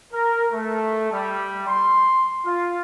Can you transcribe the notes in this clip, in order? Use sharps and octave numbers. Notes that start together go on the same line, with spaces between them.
A#4
A3
G3
C6
F4